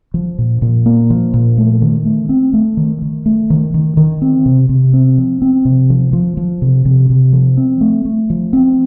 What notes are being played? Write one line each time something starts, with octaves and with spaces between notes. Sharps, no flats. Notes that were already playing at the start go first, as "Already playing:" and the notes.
F3
A#2
A#2
A#3
F3
A#2
A3
D#3
A3
C4
A3
D#3
D#3
A3
D#3
D#3
D#3
C4
C3
C3
C4
F3
C4
C3
F3
F3
F3
C3
C3
C3
F3
C4
A3
A3
F3
C4